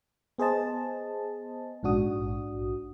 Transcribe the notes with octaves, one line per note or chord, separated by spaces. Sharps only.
B3 G#4 C5 D#5 A5
A#1 G#2 D4 F#4 D#6